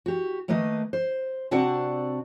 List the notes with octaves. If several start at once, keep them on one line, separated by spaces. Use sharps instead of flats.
F#4 G4
D#3 A3 A#3 B4 D#5
C5
C3 C4 D4 F#4 D5 F#5